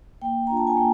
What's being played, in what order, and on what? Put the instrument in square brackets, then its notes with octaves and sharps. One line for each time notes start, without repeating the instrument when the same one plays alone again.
[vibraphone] A#3 G5
D4 F4 A#5
A5
G#5
A#3 G5